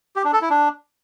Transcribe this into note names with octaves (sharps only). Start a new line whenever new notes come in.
G4
D4
A4
E4
D4